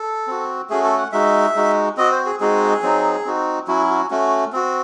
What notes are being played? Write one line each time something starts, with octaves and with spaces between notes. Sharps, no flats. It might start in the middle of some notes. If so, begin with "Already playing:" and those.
Already playing: A4
C4 F#4
A3 C#4 F#4 G#4
A4
F#5
G#3 D#4 F#4 E5
G#3 D#4 F#4
C4 F#4 D#5
C5
G#4
G#3 C4 D#4 F#4 G#4
F#3 C4 D#4
C4 D#4 F#4
F#3 C#4 E4 F#4
F#4
A3 C#4 F#4
C4 F#4